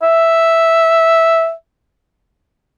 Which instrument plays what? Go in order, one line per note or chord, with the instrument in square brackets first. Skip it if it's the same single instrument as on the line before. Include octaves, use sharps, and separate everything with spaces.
[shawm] E5